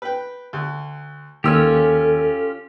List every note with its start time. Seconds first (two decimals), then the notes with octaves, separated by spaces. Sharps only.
0.02 B4 G5
0.53 D2
1.44 D#2 D#3 C#4 F4 G4 A4 E6